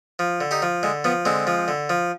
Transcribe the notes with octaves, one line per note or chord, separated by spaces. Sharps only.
F3
D3
D#4 G4
F3
D3 G#3
F3 B3
D3 G#3 C4
F3
D3
F3